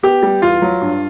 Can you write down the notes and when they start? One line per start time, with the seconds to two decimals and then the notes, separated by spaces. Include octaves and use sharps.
0.03 B3 G4
0.23 G3
0.42 E2 F4
0.62 F#3
0.81 G2